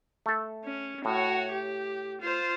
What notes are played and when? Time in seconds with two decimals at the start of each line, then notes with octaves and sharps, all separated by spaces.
0.26 A3 A4
0.64 C#4
1.05 A2 F#4 C#5
1.52 G4
2.22 F4 C5